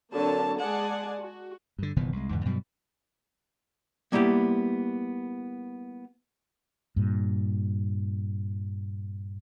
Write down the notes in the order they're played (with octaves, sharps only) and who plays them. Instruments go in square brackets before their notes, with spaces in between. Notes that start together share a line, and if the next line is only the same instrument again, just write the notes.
[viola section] D3 F#3 A#3 C4 C#5 A5
G#3 G#4 D5 F#5 G#5 A5
F#4
[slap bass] G2 D3
F#1 B2 D#3 E3
C2 G#3
E2 G#2 D3
G2 B2 F#3 G3
[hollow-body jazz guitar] G3 A#3 B3 E4 G4
[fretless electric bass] G2 A#2